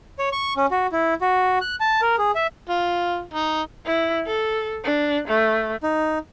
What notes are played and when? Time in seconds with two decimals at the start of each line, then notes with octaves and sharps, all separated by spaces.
0.19 C#5
0.32 C#6
0.57 C#4
0.71 F#4
0.92 E4
1.21 F#4
1.61 F#6
1.80 A5
2.02 A#4
2.18 G#4
2.35 E5
2.69 F4
3.33 D#4
3.86 E4
4.26 A4
4.85 D4
5.28 A3
5.82 D#4